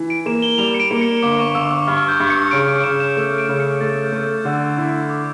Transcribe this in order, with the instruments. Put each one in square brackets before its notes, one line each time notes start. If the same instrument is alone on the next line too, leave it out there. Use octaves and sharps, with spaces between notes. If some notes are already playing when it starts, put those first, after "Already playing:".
Already playing: [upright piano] E3
[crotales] D7
[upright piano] A#3 [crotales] E7
[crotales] G7
[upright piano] G3 [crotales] F7
[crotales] C#7
D7
[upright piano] A#3
[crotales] C#7
[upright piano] G1 [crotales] D6
[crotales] C#6
[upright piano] G1 [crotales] E6
[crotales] E6
[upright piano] G2 [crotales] F6
[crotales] G6
[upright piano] G2
[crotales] C#7
[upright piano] C#3 [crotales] D7
[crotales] D7
D7
[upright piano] C#3 [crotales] E7
[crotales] E7
[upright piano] A3 [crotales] E7
[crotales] D7
[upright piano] C#3
[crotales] C#7
[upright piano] A3 [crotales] A6
[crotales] G6
[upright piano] A3
[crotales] E6
[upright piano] D3
E4
[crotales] D6